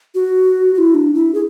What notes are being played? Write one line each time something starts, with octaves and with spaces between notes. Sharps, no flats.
F#4
F#4
E4
D4
E4
G#4